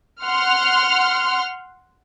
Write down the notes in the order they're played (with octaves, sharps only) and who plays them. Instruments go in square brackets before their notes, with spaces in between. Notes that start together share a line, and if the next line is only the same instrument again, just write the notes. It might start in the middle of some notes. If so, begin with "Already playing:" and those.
[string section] F#5 C6 F6